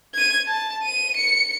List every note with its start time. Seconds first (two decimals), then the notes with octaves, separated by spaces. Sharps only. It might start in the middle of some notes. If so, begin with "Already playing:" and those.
0.15 G#6 D#7
0.47 A5
0.83 D#7
1.16 C#7